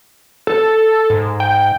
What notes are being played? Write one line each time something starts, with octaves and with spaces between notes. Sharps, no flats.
A4
G#2
G5